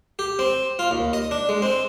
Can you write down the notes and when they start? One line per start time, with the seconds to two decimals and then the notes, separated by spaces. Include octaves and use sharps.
0.19 G4
0.39 C4
0.79 F4
0.91 D#2
1.13 D#5
1.31 D4
1.49 G#3
1.62 C4